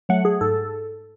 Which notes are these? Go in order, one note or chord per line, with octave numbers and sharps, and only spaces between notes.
F#3 A3 F#5
G#4
G#2 A4